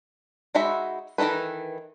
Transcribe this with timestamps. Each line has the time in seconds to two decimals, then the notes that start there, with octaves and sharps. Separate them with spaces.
0.55 G#3 D#4 F#4 E5 B5
1.18 D#3 E3 D#4 A4 B4